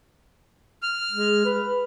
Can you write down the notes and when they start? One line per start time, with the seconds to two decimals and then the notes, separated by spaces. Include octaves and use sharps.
0.83 F6
1.11 G#3
1.45 B4